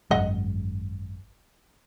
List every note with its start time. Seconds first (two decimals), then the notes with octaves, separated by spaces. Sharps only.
0.11 G#1 F#2 D#3 G#3 D#5 F#5